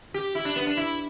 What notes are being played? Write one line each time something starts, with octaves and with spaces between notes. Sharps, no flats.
G4
E4
D4
B3
D4
E4